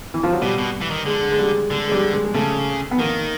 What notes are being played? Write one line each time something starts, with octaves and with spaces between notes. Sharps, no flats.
E3
F3
F#3
B2 G3
B2
E3
D#3
D3 G#3
G#3
G3
D3 G#3
G#3
G3
G#3
G#3
C#3 A3
B3
D#3 A#3